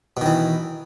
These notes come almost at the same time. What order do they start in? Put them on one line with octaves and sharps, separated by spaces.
B2 D#3 E3